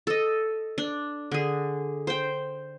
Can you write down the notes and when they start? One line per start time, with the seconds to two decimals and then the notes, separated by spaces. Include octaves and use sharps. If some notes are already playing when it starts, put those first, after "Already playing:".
0.07 A4 D#5
0.78 D4
1.32 D3 G#4
2.07 C5 G5